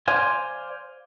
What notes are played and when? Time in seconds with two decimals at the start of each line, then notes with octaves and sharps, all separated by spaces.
0.08 C5 D5 F5 G#5